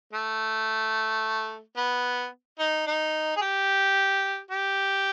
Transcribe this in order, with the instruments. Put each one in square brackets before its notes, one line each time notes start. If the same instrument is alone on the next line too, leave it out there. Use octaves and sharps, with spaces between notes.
[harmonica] A3
B3
D#4
D#4
G#4
G4
G4